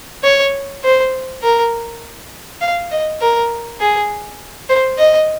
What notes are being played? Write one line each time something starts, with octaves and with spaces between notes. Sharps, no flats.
C#5
C5
A#4
F5
D#5
A#4
G#4
C5
D#5